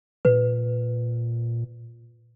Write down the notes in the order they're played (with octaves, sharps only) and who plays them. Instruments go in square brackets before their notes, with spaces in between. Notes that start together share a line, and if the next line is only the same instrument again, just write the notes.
[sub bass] A#2 [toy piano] B4